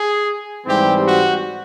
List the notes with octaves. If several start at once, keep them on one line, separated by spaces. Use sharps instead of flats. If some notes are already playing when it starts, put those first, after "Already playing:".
Already playing: G#4
G#2 E3 G3 C4 G4
F#4